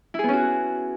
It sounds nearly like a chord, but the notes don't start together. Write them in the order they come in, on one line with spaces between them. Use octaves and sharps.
E4 G#4 B3 C#4 F#4